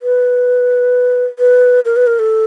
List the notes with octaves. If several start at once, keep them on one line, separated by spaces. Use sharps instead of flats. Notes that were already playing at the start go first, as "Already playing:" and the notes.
B4
B4
A#4
B4
A#4
A4